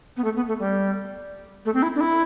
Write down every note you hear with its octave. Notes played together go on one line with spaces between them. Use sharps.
B3
A3
B3
A3
G3
A3
C4
E4
D4
E4